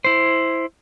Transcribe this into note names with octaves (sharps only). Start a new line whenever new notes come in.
E4 C5